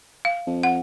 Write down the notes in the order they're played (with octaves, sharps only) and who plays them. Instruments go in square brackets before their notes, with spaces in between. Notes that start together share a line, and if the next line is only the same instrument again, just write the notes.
[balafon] F5
[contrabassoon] F2
[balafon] F#5